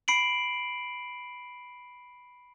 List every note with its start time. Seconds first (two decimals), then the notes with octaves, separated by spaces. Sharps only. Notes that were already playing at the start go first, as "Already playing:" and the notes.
0.08 B5 C7 D7 F#7